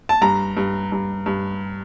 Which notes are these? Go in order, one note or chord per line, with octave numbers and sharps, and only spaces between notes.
A5
G2 A#5
G2
G2
G2